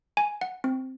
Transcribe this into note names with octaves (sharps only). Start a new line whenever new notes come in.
G#5
F#5
C4